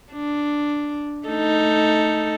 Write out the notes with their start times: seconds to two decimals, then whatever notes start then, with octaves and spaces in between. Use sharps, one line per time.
0.12 D4
1.27 A3 D#4 A4